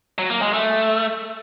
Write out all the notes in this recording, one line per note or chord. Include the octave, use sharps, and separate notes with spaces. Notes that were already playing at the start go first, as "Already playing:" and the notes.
F#3
A#3
G#3
A3